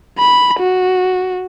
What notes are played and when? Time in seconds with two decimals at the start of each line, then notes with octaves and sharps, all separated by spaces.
0.18 B5
0.59 F#4